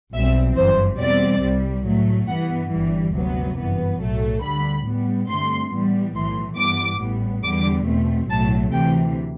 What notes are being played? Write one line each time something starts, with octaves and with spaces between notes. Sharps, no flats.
B1 B2 G3 C4 E5
G1 F#2 E3 C5
E2 B2 G3 C4 D5
C2 C3 G3
A2 F#3 A3
G2 E3 B3 F#5
G1 G2 E3 G3
D2 C3 F#3 B3
G1 F#2 E3 B3
B1 A2 F#3 A3
D2 D3 G3 B5
A2 G3 B3
G2 D3 A3 C4 C6
A2 E3 G3 B3
B1 A2 E3 A3 C6
G2 E3 G3 B3 D6
A1 A2 G3 B3
E2 D3 G3 B3 D6
E2 B2 A3 C4
B1 A2 F#3 A3 A5
D2 C3 E3 G5